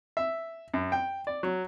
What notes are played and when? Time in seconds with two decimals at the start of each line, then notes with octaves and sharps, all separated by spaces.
0.17 E5
0.74 F#2
0.92 G5
1.27 D5
1.43 F#3